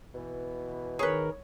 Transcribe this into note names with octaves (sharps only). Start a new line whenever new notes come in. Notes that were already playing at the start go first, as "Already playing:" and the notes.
B2 E3
D#3 G#4 A#4 B4 C#5